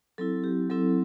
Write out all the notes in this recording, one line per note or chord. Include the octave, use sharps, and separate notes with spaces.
F#3 C4 E4 A4
G4
F#3 C4 E4 A4